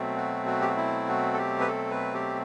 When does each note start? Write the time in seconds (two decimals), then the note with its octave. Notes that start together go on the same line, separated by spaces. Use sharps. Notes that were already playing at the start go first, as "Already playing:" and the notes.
Already playing: B2 F#3 A3 C4
0.17 F#4
0.47 F#4
0.61 G4
0.69 F#4
0.77 E4
1.08 F#4
1.34 A4
1.38 G4
1.61 B4
1.68 A4
1.90 B4
2.14 G4